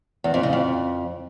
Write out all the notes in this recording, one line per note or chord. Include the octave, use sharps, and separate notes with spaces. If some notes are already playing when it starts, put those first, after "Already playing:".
E2
F2
C#3
F2